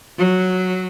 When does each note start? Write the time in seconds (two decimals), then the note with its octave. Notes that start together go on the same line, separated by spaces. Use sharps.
0.18 F#3